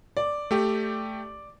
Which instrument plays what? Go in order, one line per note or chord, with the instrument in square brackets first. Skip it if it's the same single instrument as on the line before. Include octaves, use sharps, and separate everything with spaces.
[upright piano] D5
[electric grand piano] A3 G4